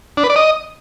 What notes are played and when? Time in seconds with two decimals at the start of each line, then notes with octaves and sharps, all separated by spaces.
0.17 D4
0.24 B4
0.30 D5
0.36 D#5